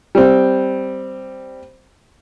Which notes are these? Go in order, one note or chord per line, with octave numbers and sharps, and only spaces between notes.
G3 C4